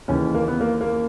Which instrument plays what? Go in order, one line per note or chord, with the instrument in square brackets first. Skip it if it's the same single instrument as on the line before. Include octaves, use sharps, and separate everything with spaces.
[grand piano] D#2 C#3 E3 C#4
A#3
B3
A#3
A#3